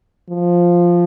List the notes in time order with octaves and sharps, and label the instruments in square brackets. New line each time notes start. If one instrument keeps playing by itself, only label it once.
[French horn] F3